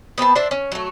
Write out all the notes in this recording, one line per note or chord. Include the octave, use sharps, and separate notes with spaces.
B3 C4 B4 A5
D4 C5 D5 E5
C#4
F#3 A3